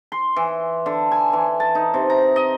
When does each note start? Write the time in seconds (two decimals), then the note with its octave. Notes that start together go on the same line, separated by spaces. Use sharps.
0.12 C6
0.36 E3
0.86 D3
1.12 G#5
1.33 E3
1.60 A5
1.75 D#4
1.94 C3
2.10 A#5
2.36 D#5